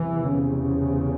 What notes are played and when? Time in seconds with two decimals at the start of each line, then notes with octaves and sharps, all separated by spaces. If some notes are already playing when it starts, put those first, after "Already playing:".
Already playing: E2 C3 E3
0.34 C#3